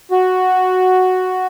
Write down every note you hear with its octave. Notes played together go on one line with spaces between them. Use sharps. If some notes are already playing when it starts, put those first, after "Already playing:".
F#4